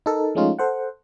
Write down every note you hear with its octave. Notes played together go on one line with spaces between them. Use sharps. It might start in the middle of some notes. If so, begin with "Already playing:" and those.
D#4 A4 A#4
F3 G#3 A3 C#4 D#4 F4
A4 C5 F#5